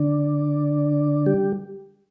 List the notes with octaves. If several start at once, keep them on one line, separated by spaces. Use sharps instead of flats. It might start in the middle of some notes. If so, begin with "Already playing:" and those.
Already playing: D3 D4
G3 G4